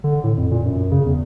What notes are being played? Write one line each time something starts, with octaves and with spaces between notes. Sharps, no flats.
D3
A2
F2
A#2
F#2
C#3
E2